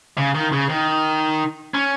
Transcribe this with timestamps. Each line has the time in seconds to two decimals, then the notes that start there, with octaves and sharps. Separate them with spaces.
0.18 C#3
0.35 D#3
0.52 C#3
0.70 D#3
1.74 C#4